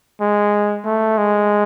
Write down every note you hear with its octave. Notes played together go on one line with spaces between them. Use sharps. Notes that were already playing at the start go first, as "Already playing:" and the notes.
G#3
A3
G#3